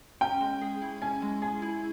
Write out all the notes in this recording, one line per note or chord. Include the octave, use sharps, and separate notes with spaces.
C#4 G5
G#3
G#4
E4
C#4 G#5
G#3
G#4 G#5
E4